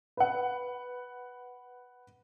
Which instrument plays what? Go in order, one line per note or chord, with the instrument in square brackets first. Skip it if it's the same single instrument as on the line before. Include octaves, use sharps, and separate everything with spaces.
[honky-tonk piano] B4 F#5